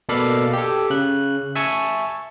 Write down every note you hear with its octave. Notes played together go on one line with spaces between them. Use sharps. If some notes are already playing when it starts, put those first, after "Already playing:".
B2 A#3 A4 D5 F5 B5
G4 A4
C#3 F#6
E5 G#5 A5 C#6